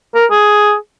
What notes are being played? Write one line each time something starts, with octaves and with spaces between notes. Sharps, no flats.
A#4
G#4